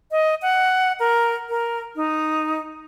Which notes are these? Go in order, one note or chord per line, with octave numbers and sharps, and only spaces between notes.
D#5
F#5
A#4
A#4
D#4